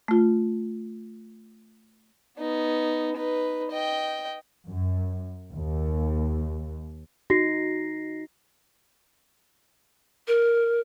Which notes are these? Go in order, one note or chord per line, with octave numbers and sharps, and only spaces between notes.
A3 F4
B3 D#4
D#4 B4
D#5 G5
F#2
D#2
D#4 F#4 A#6 C7
A#4